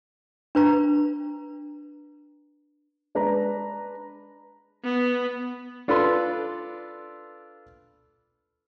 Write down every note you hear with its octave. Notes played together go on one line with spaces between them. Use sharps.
D4 B4 A#5
G#3 D4 B4 A#5
B3
D4 F4 A4 B4 B5 C6